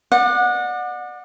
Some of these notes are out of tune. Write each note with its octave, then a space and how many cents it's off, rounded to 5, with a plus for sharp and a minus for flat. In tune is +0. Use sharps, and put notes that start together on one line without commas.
D5 +35 F#5 -25